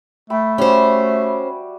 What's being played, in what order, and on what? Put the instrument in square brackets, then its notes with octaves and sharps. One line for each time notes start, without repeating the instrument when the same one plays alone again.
[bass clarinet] A3 [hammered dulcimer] E5 G5 B5
[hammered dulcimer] G3 F#4 [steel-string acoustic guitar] C#4 C5